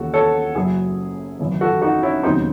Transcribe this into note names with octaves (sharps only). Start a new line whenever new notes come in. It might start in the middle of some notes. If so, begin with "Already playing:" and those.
Already playing: D#2 C#3 E3 F#4 A4
A4 C#5
F#1 F#2 C#3 F#3 E4 G#4
G#1 F#2 C#3 E3
F#4 A4
D#4 F#4
C#4 E4
E1 D#2 C#3 F#3 C4 D#4